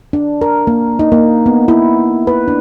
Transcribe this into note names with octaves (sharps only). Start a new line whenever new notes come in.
D4
A#4
A#3
D#4
A#3
B3
E4
B4
D4